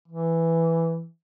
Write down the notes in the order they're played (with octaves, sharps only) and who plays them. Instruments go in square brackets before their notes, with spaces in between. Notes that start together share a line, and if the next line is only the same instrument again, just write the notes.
[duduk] E3